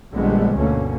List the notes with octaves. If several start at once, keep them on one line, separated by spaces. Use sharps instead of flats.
A#1 F2 D3 G3 G#3 B3
D2 G2 B2 A3 A#3 C#4